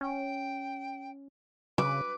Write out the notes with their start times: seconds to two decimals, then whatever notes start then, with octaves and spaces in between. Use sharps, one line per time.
0.01 C#4 G5
1.78 C#3 B4 D6